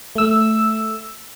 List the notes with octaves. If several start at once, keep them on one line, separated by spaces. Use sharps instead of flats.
A3 E6